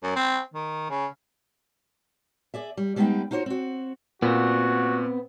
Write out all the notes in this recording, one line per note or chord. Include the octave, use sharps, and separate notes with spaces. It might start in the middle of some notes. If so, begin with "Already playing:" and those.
F#2
C4
D#3
C#3
G#4 D5 E5
G3
G3 G#3 B3 D#4 B4 G5
D#4 F4 F#4 C5 C#5
C4 F#4
A#2 B3 C4 F#4